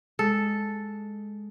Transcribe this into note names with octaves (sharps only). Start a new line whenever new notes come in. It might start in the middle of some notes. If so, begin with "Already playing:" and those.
G#3 A4